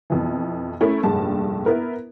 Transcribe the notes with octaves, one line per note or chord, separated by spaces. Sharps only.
F2 B2 E3
A3 C#4 E4 A#4
F1 A#1 G2 G#3 A5
B3 E4 A#4 B4